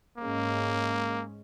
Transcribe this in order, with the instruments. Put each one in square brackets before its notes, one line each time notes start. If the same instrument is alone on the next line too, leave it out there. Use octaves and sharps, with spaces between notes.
[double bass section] G#2 G#3 C#4 [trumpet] A#3